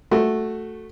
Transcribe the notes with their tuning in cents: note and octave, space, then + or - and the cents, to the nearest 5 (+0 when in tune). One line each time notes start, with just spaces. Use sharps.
A3 +0 F#4 +0